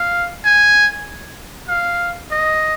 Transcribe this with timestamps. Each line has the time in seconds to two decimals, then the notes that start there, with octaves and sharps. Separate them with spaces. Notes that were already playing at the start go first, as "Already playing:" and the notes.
Already playing: F5
0.45 G#5
1.68 F5
2.31 D#5